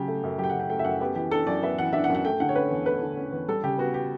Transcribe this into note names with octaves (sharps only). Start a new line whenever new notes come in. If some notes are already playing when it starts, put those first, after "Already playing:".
Already playing: C#3 F#3 G4
A3
F#2
F#3 G4
G5
C#3 F#5
G5
A3 G5
E5
F#2 F#5
B3 G4
E3 G4
D4 A4
F#2 D5
B3 E5
E3 F#5
D4 E5
F#5
F#2
F#5
A3 G5
D3 F#5
C#5
C#4 B4
E2
A3 B4
D3
C#4
E2
G3 A4
C#3 G4
B3 F#4
G4